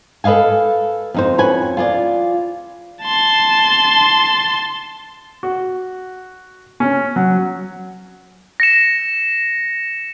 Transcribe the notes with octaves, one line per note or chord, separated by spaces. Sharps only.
A4 B4 D#5 F5 G#5
F2 D#4 C5
F2 C#4 B4 G#5
F4 G#4 D5
A5 C6
F#4
C#4
F#3
A#6 C#7 E7